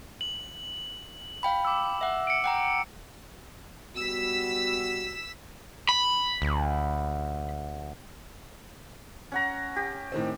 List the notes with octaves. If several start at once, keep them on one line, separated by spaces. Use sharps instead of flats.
F#7
F5 G5 B5
D6 E6
E5 F#5
C#7 D7
F#5 G5 A#5
G3 B3 F#4 E6 B6
B5
D2
C#4 F#5 A#5
G4
A2 D#3 C4